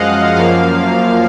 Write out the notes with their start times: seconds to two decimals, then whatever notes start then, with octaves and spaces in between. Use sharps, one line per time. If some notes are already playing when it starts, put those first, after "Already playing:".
Already playing: F#2 F3 G#3 D#5 F5 F#5
0.35 F#2 F3 A#3 F5